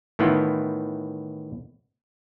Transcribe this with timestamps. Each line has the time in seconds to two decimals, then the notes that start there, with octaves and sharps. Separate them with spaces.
0.19 A2 D#3 E3 B3 E4 F4